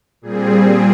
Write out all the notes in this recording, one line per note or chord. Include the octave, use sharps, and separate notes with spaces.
A#2 G3 C4 G#4